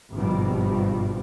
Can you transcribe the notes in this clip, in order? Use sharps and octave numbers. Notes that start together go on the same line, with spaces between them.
G#1 G2 B2 D#3 F3 G3